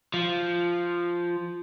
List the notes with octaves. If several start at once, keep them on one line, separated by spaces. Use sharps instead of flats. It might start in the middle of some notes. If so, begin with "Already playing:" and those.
F3